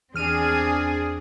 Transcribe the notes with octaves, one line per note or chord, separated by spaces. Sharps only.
E2 C4 D4 G#4 F6 D#7